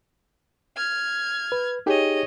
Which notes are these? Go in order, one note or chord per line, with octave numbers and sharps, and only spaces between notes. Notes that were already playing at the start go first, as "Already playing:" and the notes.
F6 G#6
B4
D#4 G4 G#4 C#5 D#5